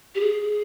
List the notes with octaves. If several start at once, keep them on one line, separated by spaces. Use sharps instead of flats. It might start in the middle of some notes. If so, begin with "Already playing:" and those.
G4
G#4